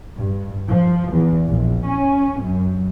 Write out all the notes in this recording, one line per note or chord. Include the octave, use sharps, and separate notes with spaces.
G2
F3
E2
A#1
C#4
F#2